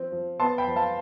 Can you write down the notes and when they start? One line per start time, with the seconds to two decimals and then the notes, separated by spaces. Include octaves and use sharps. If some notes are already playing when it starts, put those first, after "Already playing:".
Already playing: F3 C4
0.12 F3
0.40 B3 A5 C6
0.58 G5 B5
0.67 F3
0.76 F5 A5